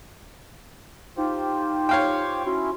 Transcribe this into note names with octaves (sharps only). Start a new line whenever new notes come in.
D#4 F4 G4 C5
C#5 F5 G5
C#4 E4 F#4 C6